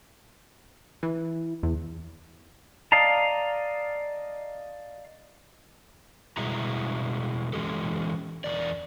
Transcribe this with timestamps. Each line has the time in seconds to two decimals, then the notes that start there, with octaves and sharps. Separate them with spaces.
1.03 E3
1.63 E2
2.92 D5 D#5 F5 A5 A#5
6.37 B2 G3 G#3 E4 F#4 A#5
7.53 E3 G#3 C#4 G4 A4
8.44 E2 C3 A#4 D5